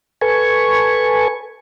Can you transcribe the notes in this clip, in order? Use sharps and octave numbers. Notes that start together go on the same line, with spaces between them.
A4 B4 G#5 C#6